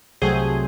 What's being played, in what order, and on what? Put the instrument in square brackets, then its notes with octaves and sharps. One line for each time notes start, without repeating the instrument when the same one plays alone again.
[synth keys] C2 C3 F#3 A3 G#4 C5